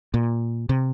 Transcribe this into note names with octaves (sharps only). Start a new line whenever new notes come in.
A#2
C3